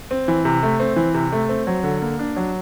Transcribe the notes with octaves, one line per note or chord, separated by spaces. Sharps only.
C4
E3
C3
A3
C4
E3
C3
A3
C4
F#3
D3
A#3
D4
F#3